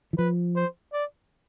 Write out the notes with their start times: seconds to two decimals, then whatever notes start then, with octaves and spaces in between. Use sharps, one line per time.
0.13 E3
0.18 F3 B4
0.56 C5
0.93 D5